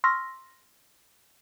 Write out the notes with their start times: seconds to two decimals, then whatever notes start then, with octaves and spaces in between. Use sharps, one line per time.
0.04 C6 C#6 E6 F6 A#6 B6